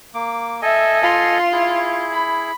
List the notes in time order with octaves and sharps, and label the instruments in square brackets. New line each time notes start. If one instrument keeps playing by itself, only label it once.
[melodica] A#3 D6
[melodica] A4 D#5 G#5 [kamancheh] E5
[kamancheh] F4 C6
[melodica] E4 G#4
[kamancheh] B5